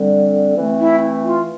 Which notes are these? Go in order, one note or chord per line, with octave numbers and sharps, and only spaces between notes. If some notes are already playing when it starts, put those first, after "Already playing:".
Already playing: D3 G3 C4
E3 A3 C4
E4
F4